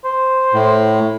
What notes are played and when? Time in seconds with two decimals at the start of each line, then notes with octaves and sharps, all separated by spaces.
0.04 C5
0.53 A2